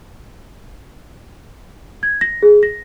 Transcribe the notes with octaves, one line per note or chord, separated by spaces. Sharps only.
G#6
A#6
G#4
A#6